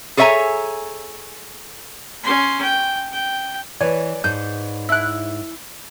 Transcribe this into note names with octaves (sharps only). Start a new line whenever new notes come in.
G#4 A4 C#5 E5 G#5 A#5
C#4 C6
G5
G5
E3 B4 C#5 D5 G#5
G#2 G6
E4 F#6